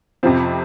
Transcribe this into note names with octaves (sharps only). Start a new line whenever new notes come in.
F2 C3 F3 C4